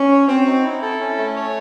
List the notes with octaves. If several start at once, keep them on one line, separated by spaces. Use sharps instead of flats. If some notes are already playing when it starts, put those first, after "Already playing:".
Already playing: C#4
C#5
C4 F#4
D#4
E4
A4
C#4
A3
C#5